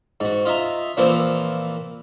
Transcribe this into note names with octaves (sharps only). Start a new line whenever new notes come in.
G#2 F#4
F4 D#5 E5 A#5
A#2 E3 F3 A#3 C4 E4